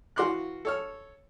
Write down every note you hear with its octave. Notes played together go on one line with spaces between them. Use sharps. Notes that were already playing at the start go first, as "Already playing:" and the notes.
E3 F#4 F5 C6 D6 F#6
A4 C#5 F6